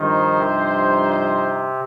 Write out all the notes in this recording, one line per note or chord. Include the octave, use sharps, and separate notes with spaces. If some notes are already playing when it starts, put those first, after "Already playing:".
Already playing: G2 D#3 F3 D#4 C5
C3